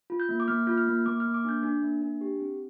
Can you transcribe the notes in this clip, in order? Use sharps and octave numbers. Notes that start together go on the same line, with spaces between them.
F4
G6
A#3
D6
A#3 F6
F4 G6
F6
A#3
A#3 D6
A#3 F6
D6
D4 G6
D4
A#3
D4
G4
C4